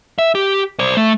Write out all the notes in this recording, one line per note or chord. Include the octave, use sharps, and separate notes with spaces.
E5
G4
C5 D5
A3